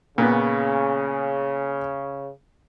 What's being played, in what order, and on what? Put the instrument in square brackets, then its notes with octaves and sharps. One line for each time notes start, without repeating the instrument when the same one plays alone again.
[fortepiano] A#2 B3 [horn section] C#3